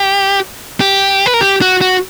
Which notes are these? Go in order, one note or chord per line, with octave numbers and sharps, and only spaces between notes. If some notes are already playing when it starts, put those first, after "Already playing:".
Already playing: G4
G4
B4
A#4
G4
F#4
F#4